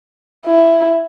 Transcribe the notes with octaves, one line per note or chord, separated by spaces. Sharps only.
E4